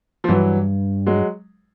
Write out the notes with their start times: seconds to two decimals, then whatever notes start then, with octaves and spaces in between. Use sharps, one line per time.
0.24 F3
0.29 G2 E3 F#3
1.06 F#3 G#3